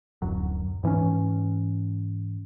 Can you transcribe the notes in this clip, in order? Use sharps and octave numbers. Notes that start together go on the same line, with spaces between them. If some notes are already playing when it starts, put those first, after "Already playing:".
D1 F#2 F#3
G#2 E3 C4 C#4